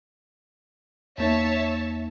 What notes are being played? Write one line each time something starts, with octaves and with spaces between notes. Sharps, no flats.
E2 A#3 D#4 C#5 E5 A5